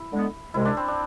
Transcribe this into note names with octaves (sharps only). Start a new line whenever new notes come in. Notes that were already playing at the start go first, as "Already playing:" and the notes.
Already playing: E4
D3 G#3 B3
C2 C3 G#3 E4
D4
C4
D4